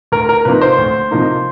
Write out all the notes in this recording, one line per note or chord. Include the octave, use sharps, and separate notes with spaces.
D2 A#4
A#4
C3 F3 A#3 D#4 B4
C5
D2
C3 F3 A#3 D#4